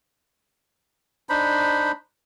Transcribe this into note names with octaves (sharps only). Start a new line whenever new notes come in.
D4 D#4 C5 B5